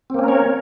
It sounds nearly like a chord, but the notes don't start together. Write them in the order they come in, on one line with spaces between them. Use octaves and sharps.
C4 A#3 C#4 A#4 C#5